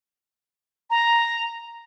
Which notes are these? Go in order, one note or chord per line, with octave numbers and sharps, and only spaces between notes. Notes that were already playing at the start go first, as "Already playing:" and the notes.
A#5